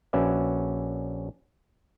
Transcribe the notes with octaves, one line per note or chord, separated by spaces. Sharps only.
A#1 C#4 F#4 B4 D5 E5